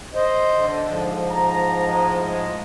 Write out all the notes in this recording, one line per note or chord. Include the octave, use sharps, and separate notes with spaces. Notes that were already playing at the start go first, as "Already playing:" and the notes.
C5 D#5
D3
G#2 F3
A#5
A2 G#3 D#5